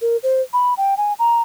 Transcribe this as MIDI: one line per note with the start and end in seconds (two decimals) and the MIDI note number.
0.02 0.17 70
0.23 0.41 72
0.53 0.74 83
0.78 0.97 79
0.97 1.13 80
1.19 1.42 82